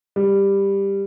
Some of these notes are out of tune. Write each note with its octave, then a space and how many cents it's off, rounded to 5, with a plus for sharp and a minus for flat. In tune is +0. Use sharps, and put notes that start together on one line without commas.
G3 +10